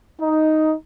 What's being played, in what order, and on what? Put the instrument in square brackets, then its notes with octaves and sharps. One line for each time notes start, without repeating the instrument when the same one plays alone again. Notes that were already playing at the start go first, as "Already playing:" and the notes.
[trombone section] D#4